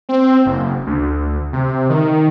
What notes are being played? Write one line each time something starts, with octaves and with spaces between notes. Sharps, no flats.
C4
F#1
D2
C3
D#3